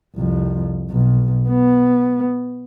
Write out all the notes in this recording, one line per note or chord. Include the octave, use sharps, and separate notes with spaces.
C2 F2
B1
B3